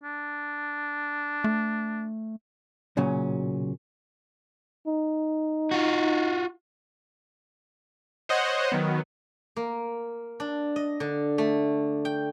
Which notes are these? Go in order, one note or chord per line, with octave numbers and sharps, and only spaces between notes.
D4
A3
B1 A#2 C#3 F#3 C#4
D#4
F4 F#4
C5 C#5 D#5 F#5
D#3 F#3 B3
A#3
D4
D#5
D3
A3
G5